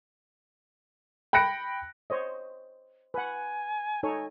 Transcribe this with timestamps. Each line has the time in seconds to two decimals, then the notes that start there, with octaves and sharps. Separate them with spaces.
1.33 G5 B5 F#6 A#6 C#7 D7
2.10 C5 C#5 D#5
3.14 B4 F#5 G#5
4.03 D#4 A4 C#5 G#5